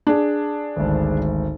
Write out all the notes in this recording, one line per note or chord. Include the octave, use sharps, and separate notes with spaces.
D4 G#4
G#1 D2